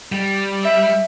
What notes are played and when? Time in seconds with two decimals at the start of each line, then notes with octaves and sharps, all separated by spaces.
0.12 G3
0.62 E5